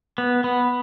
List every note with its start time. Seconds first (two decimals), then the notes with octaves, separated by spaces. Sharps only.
0.18 B3
0.44 B3